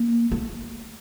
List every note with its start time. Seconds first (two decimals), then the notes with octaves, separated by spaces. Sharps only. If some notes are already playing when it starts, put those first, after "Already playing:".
Already playing: A#3
0.32 A3